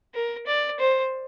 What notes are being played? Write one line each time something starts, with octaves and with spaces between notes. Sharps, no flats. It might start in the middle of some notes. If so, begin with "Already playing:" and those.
A#4
D5
C5